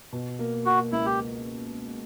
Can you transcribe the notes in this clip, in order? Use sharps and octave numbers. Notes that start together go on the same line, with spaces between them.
B2
A#3
A#3 F#4
C#2 E4
G4